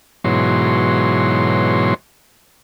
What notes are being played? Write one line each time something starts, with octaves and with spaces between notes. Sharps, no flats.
G#2 B2 E3 F#3 C#5 C6